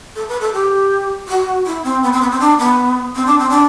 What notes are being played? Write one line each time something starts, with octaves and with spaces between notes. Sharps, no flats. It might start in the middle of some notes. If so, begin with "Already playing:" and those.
A4
B4
A4
G4
F#4
E4
C4
B3
C4
B3
C4
D4
B3
C4
D4
C4
D4